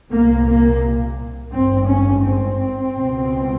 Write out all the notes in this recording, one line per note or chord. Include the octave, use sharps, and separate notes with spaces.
C2 A#2 A#3
A#3
G#1 G2 C4
C#4
C4
C#2 B2